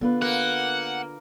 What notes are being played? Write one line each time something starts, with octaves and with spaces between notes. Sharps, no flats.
D3 B3 F4 B4
A#3 F#5